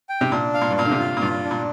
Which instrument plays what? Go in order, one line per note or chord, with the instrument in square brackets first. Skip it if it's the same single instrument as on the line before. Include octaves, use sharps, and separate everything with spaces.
[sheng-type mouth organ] G5
[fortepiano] C3
[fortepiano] A#2 [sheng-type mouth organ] D4
[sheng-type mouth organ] F5
[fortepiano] A#2
G2
[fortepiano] A#2 [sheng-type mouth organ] F5
[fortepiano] D3
C3
[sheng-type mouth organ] F4
[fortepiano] A#2
[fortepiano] G2 [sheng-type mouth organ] F4
[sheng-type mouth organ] D4
[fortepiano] A#2